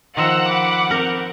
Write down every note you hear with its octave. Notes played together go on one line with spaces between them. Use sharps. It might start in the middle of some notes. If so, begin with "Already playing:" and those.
D#3 F3 F#5 A#5 E6
B5 D6
C4 A#4